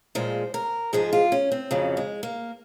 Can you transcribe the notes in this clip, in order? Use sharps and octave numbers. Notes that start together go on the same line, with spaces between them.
A#2 F3 G#3 C5
A#4
G#2 F3 G#3 G#4
F4
C#4
C4
F2 C#3 F#3
G#3
A#3